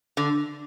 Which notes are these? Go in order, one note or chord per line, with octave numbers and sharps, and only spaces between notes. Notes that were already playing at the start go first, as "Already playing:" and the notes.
D3